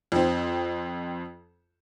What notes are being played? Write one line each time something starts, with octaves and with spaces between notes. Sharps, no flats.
F2 C4